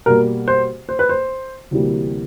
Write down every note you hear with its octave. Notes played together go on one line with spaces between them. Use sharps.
B2 G3 A#3 A#4
C5
C5
B4
C5
D2 C3 E3 G3 A#3